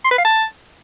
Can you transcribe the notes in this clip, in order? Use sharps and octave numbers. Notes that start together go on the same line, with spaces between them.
C6
B4
F5
A5